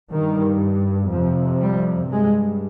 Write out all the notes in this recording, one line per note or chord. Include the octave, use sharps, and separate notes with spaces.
G2 D#3
F2 C3 F3
G3
G2 G#3